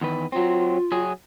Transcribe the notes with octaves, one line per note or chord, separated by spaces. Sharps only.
E2 D#3 B4
F#3 C4 F4
F#3 G#4